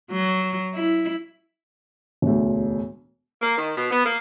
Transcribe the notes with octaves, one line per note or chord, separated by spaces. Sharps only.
F#3
E4
E1 D2
A#3
D#3
B2
B3
A#3